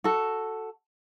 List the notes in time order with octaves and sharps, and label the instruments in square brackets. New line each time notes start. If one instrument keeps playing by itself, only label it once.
[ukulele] F#4 A4